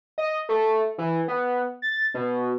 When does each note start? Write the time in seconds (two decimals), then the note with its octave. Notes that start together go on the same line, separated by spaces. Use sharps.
0.18 D#5
0.49 A3
0.98 E3
1.28 B3
1.82 A6
2.14 B2